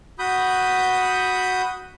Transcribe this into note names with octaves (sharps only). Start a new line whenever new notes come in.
F#4 B5 D#6 G6